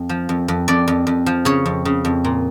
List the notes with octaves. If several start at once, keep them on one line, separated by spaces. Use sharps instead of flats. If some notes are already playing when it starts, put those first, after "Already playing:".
Already playing: F2
F3
F2
F2
F2 D5
F2
F2
F3
C#3 C#5
F2
C#3
F2
A#2